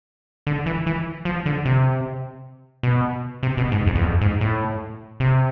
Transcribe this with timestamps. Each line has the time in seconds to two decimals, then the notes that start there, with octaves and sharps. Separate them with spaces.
0.47 D3
0.66 E3
0.87 E3
1.25 F3
1.46 D3
1.65 C3
2.83 B2
3.43 C3
3.57 B2
3.72 G#2
3.87 F2
3.95 E2
4.02 F2
4.21 G#2
4.41 A2
5.20 C3